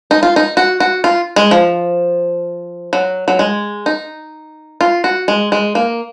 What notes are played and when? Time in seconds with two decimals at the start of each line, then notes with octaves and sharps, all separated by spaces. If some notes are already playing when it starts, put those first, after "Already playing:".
0.11 D#4
0.23 F4
0.36 D#4
0.57 F#4
0.80 F#4
1.04 F4
1.36 G#3
1.51 F3
2.93 F#3
3.28 F#3
3.39 G#3
3.86 D#4
4.81 F4
5.04 F#4
5.28 G#3
5.52 G#3
5.75 A#3